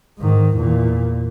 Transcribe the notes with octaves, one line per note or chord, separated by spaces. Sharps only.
G#2 D#3
E2 A#2